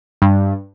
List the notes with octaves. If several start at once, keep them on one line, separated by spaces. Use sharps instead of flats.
G2